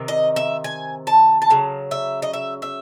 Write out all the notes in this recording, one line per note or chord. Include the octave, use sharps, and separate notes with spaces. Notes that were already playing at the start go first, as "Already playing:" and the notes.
Already playing: C3 D#3
D#5
E5
G#5
A5
A5
C#3 F#3
E5
D#5
E5
E5